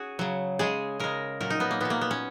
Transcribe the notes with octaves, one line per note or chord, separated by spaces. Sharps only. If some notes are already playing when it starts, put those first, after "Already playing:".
Already playing: C#4 F#4 G#4
C#3 F#3
C#3 G#3 G#4
C#3 G#3 A#4
A#2 F#3 A#4
D#4
B3
A#3
A#2 F#3 B3
A#3
B3
C#4